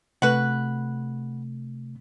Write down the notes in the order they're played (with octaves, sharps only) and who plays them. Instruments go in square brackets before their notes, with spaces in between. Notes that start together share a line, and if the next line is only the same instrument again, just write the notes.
[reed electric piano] C3 A3 [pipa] F#4 B4